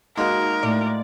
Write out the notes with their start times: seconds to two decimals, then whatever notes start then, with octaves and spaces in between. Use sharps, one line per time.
0.18 G#3 A#3 D#4 F#4 A#4
0.63 A2 D5